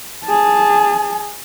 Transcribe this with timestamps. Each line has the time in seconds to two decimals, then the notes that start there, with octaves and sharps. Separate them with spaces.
0.25 G#4 A5